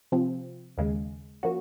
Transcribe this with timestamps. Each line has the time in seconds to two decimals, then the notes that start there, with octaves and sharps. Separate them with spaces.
0.12 C3 F3 C4
0.78 D#2 C#3 G#3
1.43 F3 A#3 C#4 F#4